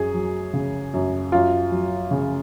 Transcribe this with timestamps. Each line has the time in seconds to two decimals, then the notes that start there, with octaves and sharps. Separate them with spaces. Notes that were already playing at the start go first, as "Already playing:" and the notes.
Already playing: F#2 G#4
0.14 F#3
0.53 C#3
0.94 F#2
1.32 F#2 F4
1.72 F#3
2.11 C#3